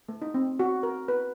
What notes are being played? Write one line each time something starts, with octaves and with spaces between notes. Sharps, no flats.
A3
D#4
C4
F#4
A#4
B4